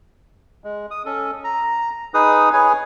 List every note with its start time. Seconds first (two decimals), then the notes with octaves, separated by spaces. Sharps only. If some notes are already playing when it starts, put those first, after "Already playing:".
0.64 G#3
0.91 D#6
1.06 C#4 A4
1.44 A#5
2.14 D#4 G#4 B4 D#6
2.53 G#4 B4 C#5 G#5